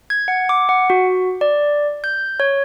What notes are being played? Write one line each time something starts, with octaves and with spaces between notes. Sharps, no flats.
G#6
F#5
D6
F#5
F#4
D5
G6
C#5